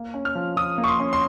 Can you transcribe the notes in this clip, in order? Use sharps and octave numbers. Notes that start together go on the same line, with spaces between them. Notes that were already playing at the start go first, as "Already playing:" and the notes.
Already playing: A#3
C#4
F6
F3
F3 D#6
A#3
C#6
C6
C#4
C6